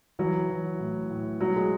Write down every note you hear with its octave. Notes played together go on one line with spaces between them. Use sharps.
E3 F#3
E3
A2
A2
B2 F#3
G#3